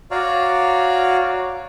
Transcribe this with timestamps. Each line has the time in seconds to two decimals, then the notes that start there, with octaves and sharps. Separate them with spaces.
0.11 F#4 C#5 D5 F5 A#5